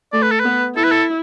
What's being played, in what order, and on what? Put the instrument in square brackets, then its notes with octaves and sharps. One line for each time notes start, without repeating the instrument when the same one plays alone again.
[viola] A3 [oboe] D5
[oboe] B4
A4
[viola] B3 [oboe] B4
[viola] E4 [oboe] A4
[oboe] B4
A4